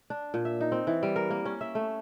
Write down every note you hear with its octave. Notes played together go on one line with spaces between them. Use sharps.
D4
A#2
E5
D#4
C4
E3
G3
A#4
A#3
C#4
E5
A3